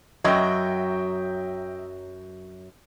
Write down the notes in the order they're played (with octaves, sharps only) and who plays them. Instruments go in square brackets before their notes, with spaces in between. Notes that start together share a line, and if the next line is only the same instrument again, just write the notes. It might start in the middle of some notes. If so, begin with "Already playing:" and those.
[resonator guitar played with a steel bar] F#2 F#3 [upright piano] D#5 E5 G5